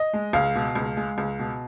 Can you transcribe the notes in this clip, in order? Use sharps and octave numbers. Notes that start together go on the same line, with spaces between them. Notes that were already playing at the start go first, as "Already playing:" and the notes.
Already playing: D#5
G#3
C#2 F5
B2
C#2
G#3
C#2
B2